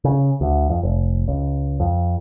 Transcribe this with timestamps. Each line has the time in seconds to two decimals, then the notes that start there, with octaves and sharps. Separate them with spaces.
0.04 C#3
0.41 D2
0.70 F2
0.83 F1
1.28 C#2
1.80 F2